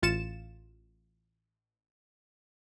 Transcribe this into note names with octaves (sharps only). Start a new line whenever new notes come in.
A1 F4 A6 C#7 E7